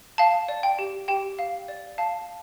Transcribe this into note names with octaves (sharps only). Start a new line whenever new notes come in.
F5 A5
D5
G5
G4
G4 G5
F5
D5
F5 A5